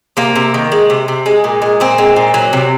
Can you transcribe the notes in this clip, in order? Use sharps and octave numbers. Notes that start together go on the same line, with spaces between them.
C3 A#3
C3
D#3
G#3
C3
C3
G#3
A#2
G#3
A#2 C4
G#3
A#2
F#3
C3